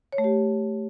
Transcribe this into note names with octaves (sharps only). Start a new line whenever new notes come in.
C#5
A3
G4